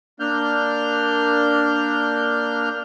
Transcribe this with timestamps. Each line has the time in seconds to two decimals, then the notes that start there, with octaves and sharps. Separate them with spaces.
0.20 A#3 D4 F6 G6